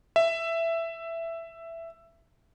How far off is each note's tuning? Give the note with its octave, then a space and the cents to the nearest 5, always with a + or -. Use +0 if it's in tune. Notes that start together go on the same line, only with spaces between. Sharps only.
E5 +10